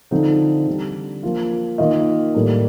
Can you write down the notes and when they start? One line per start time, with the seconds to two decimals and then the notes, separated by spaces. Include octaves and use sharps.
0.11 D3 F3 C4 D#4
0.67 D3 G3 D4
1.23 F3 A#3 F4
1.78 D#3 A#3 F4 A#4 D#5
2.34 A2 G3 A#3 D4